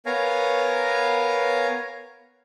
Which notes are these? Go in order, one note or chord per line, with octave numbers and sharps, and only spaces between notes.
B3 A#4 C#5 F5 G#5 A#5